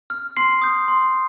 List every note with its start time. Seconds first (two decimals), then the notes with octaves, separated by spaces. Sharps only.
0.10 F6
0.37 C6 C7
0.62 D#6 G6
0.88 C6